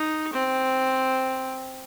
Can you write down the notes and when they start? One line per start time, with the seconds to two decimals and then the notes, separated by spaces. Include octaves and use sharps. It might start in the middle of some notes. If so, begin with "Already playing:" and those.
Already playing: D#4
0.33 C4